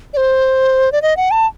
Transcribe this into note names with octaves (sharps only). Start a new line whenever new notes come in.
D5
C5
D5
D#5
F#5
A5